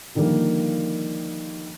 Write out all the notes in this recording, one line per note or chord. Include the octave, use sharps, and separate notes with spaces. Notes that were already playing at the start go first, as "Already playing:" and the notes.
D3 D#3 F3 G3 A#3